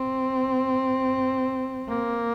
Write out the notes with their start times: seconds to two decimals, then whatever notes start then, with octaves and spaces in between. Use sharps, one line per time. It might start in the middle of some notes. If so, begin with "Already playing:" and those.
Already playing: C4
1.88 A#3